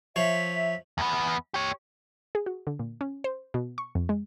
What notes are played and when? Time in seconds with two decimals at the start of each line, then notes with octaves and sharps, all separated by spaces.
0.16 F3 C#5 E5
0.98 E2 B3
1.54 G4 C#5
2.35 G#4
2.46 F#4
2.67 D3
2.79 A#2
3.01 C#4
3.24 C5
3.54 B2
3.78 C#6
3.95 F2
4.09 G#3